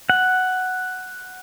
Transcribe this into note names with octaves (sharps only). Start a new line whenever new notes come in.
F#5